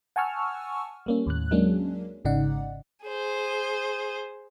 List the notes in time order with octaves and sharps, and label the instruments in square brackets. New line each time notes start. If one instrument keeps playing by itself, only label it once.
[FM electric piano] F#5 G#5 A5 C#6 E6 F6
G3 A#3 C#4
D#2 A2 F#6
F#3 G#3 A#3 C#4 D4
G#1 G#2 C#3 D#4 D5 F#5
[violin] G#4 C5